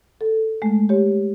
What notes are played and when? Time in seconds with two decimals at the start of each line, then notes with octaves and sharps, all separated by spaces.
0.21 A4
0.62 G#3 A3
0.89 G4 C#5